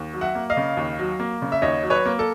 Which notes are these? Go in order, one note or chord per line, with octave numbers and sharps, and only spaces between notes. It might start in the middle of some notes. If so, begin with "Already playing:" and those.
Already playing: D#2
F#3
E5 F#5
A#3
D#5 F5
C#3
D#2
F#3
A#3
C#3
E5
D#2 C#5 D#5
F#3
B4 C#5
A#3
A4